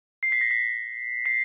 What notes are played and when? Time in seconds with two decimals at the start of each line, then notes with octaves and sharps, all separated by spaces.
0.23 C7
0.32 B6
0.41 A#6
0.51 B6
1.26 C7